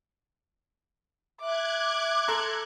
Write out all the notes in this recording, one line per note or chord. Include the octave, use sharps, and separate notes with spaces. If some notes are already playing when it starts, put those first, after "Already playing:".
E5 D6 F#6 G#6
A4 A#5 C6